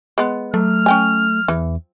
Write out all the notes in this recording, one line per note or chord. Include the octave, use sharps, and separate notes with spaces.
G#3 B3
F#3 A3 F6
C#4 G5 G#5
E2 E3